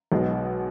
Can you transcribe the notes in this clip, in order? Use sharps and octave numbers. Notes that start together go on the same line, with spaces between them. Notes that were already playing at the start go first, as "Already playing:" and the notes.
B1 B2 G#3